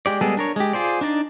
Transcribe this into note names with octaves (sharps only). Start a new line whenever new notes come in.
G#3 G4 D5
G3 G#3 B3 G#4 A4
D4 A#4 C#5
G#3 G4
F4 G#4 C5 D5
D4 D#4 D5